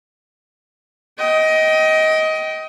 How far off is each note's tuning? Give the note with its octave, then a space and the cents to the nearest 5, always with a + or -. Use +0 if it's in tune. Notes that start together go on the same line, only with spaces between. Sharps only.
D#5 +20 G5 -20